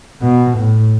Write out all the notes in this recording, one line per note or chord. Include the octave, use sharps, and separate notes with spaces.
B2
A2